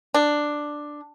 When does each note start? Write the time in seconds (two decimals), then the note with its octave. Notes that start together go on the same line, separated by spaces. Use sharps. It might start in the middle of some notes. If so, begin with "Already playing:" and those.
0.14 D4